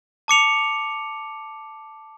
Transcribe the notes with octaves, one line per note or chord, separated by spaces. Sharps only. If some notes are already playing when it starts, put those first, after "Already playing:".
A5 D6 C#7 F7